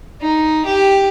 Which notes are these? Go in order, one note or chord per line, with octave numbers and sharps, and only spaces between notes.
D#4
G4